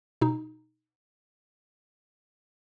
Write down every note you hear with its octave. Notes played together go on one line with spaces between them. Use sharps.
B2 D#4